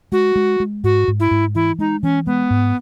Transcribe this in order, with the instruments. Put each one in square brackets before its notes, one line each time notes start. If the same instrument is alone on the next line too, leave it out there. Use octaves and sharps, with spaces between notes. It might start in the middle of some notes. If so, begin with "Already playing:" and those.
[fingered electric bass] G#3 [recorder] F#4
[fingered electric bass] G#3
G#3
[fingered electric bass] G#2 [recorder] F#4
[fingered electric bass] G#2
[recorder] E4
[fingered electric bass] G#2
[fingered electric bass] E3 [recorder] E4
[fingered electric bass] G#3 [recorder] D#4
[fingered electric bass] E3 [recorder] C#4
[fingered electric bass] G#3 [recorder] B3
[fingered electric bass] G#2